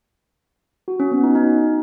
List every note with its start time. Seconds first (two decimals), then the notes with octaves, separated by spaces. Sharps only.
0.88 F#4
1.00 C#4
1.12 B3
1.23 D#4
1.35 D#4